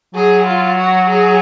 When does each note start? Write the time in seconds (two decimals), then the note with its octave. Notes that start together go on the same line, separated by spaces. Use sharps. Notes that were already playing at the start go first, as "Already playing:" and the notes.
0.14 F#3 G#4
0.47 F4
0.78 F#4
1.09 G#4